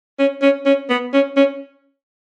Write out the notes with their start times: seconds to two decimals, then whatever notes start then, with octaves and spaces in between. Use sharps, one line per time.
0.19 C#4
0.42 C#4
0.66 C#4
0.90 B3
1.14 C#4
1.37 C#4